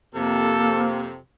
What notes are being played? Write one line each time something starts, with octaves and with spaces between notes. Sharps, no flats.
F2 C3 A#3 A4